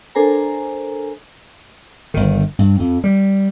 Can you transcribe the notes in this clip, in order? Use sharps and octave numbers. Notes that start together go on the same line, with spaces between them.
D4 A4 A#4 C5 G#5 A#5
G1 D#3
G2
F2
G3